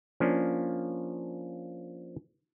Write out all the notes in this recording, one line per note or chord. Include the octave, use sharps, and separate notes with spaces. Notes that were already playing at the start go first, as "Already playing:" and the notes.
F3 A#3 C#4 D4